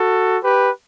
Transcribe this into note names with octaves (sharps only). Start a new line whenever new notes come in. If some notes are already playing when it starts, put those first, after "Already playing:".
Already playing: F#4 A4
G4 B4